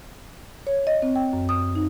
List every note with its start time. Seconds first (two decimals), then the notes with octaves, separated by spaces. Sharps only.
0.67 C#5
0.87 D#5
1.02 C4
1.16 G5
1.33 F#2
1.49 D#6
1.76 D#4